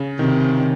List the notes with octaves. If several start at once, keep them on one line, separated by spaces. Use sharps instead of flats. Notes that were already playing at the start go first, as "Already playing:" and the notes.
Already playing: C#3
C3 D#3
D#3